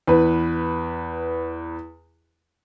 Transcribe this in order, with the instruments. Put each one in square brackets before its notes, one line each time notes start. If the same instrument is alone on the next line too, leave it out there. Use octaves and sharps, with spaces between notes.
[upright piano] E2 B4